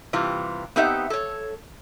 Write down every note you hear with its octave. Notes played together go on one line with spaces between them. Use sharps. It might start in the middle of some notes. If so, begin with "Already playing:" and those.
C3 E3 G3 F4
B3 C4 D#4 G4 E5 F#5
A4 C#5